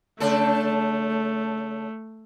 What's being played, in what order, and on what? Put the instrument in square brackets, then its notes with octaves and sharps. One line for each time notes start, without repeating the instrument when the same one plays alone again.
[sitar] C#3 D4 A4 [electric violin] A3